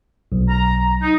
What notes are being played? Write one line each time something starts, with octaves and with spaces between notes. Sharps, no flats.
B1
A#5
D#4